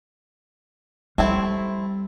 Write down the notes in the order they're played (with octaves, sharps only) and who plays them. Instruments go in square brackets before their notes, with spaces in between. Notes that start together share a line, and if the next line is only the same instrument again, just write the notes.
[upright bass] G3 [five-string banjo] A3 C4 E4